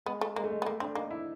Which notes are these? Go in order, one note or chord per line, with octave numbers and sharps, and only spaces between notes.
G#3 B3
A3
G#3 A#3
A3
G#3
B3
A3 A#3
C4 D4
A#3 D#4
E4